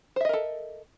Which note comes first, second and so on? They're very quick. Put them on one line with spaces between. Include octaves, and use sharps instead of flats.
C5 E5 D#5 A#4 A4